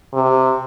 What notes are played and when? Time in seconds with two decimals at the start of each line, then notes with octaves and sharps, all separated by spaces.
0.14 C3